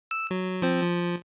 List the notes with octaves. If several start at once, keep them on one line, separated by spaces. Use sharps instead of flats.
E6
F#3
F3 C4
F3